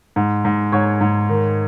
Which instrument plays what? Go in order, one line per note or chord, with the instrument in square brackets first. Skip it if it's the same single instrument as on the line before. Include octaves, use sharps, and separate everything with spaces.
[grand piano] G#2
G#2
G#2 C#5 C#6
G#2
D#3